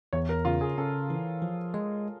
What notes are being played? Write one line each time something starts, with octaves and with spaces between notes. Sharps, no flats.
E2 C#5
A#4
C#3 F4
G#4
C#3 A4
E3
F3
G#3